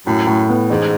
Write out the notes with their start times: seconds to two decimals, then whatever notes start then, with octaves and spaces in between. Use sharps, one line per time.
0.06 F#2 A2
0.27 A2
0.49 B3
0.70 A1 G#2